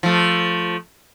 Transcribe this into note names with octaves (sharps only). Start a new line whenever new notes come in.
F3 A3